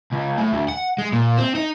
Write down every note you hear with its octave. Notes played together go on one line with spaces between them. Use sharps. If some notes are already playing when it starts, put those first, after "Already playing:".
C#2
A2
D2
F#5
G#3
A#2
C4
D#4